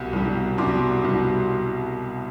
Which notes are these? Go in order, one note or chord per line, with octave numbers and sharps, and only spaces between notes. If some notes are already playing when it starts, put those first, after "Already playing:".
Already playing: C2 B2 G3
C2 B2 G3
C2 B2 G3 C6 D6
C2 B2 G3